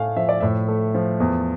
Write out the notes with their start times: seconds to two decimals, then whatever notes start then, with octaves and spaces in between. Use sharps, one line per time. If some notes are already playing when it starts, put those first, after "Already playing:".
Already playing: A2 A3 F5 G#5
0.16 F3 E5
0.29 D5
0.40 A2 E5
0.68 A3
0.94 F3
1.20 E2